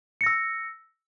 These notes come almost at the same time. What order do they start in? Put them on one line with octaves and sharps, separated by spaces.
C#7 A#6 E6